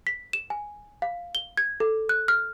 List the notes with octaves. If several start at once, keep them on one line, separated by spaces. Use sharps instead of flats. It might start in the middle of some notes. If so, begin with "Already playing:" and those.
B6
E7
G#5
F5
G7
G#6
A4
F#6
F6